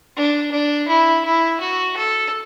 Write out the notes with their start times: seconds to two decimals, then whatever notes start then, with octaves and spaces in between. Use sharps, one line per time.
0.16 D4
0.51 D4
0.88 E4
1.25 E4
1.60 F#4
1.96 A4